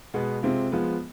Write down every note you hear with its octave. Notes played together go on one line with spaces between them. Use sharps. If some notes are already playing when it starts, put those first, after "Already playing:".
B2 G#3 B3
C3 G#3 C4 F4
F3 G#3 B3 F4